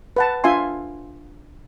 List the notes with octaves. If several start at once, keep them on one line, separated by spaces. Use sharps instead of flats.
B4 F#5 A5
D4 F4 E5 G#5 C6